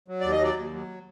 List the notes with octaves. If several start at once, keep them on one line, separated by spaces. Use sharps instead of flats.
F#3
D#2 D5
D#5
F#3 D5
D#2
F#3